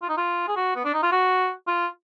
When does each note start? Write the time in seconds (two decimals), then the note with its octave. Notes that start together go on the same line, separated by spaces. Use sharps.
0.02 F4
0.09 D#4
0.17 F4
0.48 G#4
0.56 F#4
0.76 B3
0.85 D4
0.94 D#4
1.03 F4
1.12 F#4
1.67 F4